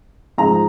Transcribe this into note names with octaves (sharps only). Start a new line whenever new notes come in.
G#2 F3 G#3 D#4 A#5